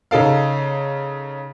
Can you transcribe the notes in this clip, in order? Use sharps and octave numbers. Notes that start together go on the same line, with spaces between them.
C#3 D#4 A4 F5